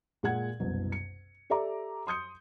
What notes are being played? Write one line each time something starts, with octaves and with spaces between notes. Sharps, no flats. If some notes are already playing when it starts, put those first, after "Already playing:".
A#2 G#3 F#5 G#6
F#1 C2 B2
C#7
G4 A4 D5 E5 A#5 D6
C6 D#6 G6 C#7